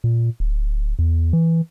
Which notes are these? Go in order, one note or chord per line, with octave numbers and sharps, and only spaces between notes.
A#2
D1
E2
E3